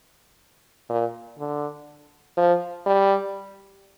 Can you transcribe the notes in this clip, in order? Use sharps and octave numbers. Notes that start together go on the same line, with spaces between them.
A#2
D3
F3
G3